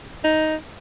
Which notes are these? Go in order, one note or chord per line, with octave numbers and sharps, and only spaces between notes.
D#4